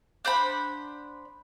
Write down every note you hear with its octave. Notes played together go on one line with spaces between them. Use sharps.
D4 C5 F#5 B5